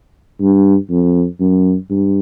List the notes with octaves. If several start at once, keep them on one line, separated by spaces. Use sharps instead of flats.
G2
F2
F#2
G2